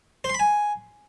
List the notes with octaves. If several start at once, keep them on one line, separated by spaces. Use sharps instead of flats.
C5
C6
B5
G#5